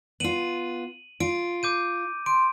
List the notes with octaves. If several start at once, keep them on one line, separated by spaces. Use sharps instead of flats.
B3 F4 D#7 F#7
F4 D7
D6 G6 D#7
C6 D7